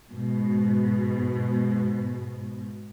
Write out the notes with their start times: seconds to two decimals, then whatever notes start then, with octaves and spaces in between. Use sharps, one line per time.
0.11 G#2 B2